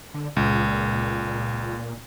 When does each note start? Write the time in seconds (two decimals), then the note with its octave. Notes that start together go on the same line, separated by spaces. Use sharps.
0.14 D3
0.36 C#2 A#2